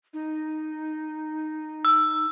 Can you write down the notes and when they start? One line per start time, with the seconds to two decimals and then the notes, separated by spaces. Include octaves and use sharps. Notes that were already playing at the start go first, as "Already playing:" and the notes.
0.13 D#4
1.85 E6